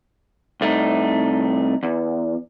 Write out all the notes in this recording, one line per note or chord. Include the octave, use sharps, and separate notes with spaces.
C2 A3 D#4
E2